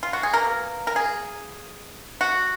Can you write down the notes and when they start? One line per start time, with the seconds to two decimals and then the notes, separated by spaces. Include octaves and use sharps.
0.03 F4
0.13 F#4
0.23 G#4
0.33 B2 A#3 A#4
0.87 A#4
0.96 G#4
2.21 F#4